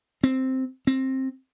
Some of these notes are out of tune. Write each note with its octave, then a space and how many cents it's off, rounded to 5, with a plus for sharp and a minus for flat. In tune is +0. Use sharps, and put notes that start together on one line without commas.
C4 +0
C4 +15